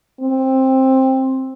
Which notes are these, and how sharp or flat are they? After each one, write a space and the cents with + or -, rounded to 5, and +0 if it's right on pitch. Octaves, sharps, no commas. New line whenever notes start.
C4 +10